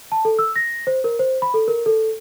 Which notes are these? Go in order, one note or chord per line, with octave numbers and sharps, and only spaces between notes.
A5
A4
E6
A#6
C5
A#4
C5
B5
A4
A#4
A4